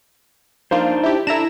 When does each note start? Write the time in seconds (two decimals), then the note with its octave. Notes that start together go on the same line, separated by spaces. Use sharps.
0.71 F3 A#3 D4 D#4 F4 C5
1.03 E4 G4
1.27 D4 E4 A4 A#5 E7